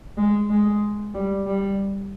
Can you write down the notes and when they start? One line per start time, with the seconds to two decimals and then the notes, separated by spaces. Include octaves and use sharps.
0.18 G#3
0.50 G#3
1.14 G3
1.46 G3